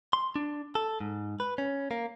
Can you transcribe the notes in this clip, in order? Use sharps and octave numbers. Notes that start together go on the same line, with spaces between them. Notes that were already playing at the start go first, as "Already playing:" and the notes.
C6
D4
A4
G#2
B4
C#4
A#3